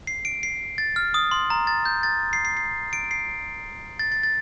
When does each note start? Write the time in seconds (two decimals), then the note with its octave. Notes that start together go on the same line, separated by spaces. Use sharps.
0.07 C7
0.25 D7
0.43 C7
0.78 A6
0.96 F6
1.14 D#6
1.31 C6
1.50 A#5
1.67 A6
1.85 G6
2.03 A6
2.33 C7
2.45 C7
2.57 C7
2.93 D7
3.11 C7
3.99 A6
4.12 A6
4.23 A6